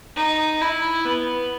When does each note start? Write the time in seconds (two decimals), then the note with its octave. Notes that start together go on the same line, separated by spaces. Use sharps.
0.16 D#4
0.61 E4
1.05 B3